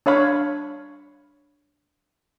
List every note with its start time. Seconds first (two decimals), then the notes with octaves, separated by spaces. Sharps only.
0.06 D4 C#5 F5 B5